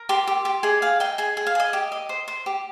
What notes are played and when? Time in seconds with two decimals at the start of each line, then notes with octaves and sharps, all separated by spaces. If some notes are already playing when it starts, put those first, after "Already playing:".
Already playing: A#4
0.09 G4 C6
0.27 G4
0.45 G4
0.63 G#4 D#5
0.82 G#4 F5
1.00 D#5 G5
1.18 G#4 G#5
1.37 G#4
1.47 F5
1.55 G#4 D#5
1.73 G4
1.92 D#5
2.09 C5
2.28 C5
2.46 G4